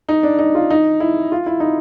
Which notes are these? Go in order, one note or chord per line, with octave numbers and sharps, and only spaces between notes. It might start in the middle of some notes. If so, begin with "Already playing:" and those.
D#4
D4
D#4
F4
D#4
E4
F4
E4
D#4